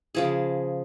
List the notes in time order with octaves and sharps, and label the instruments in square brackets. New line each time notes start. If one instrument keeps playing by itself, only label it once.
[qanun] C#3 F3 G#4